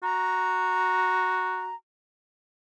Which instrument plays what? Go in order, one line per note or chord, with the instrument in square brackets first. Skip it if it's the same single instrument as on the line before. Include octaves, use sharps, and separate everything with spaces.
[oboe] F#4 [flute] A#5